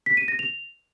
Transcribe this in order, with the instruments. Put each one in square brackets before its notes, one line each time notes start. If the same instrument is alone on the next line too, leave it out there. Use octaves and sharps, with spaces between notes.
[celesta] B6
D#7
A#6
F7